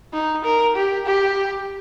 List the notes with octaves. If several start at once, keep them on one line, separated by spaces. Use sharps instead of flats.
D#4
A#4
G4
G4